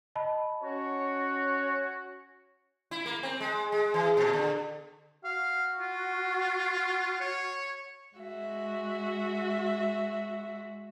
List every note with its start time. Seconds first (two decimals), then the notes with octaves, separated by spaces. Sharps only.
0.15 D#5 A5 B5
0.62 C#4 F#4 C#5
2.91 E4
3.06 A#3
3.23 C4
3.40 G#3
3.72 G#3
3.94 E3
4.17 A#2
4.33 D3
5.24 F#4 F5
5.80 F4
7.21 C#5
8.16 G#3 F#4 E5